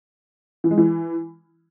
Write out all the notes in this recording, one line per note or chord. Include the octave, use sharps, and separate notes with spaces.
E3
G#3
E3